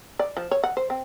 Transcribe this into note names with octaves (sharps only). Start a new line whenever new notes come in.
D5
F3
C#5
F#5
C5
C4